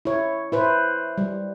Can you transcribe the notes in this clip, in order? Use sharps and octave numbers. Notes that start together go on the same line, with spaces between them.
E4 C#5
E4 B4 C5
G3